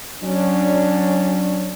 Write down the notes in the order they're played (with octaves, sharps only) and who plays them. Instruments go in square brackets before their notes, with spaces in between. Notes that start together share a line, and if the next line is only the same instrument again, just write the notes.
[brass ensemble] F#3 C#4 D4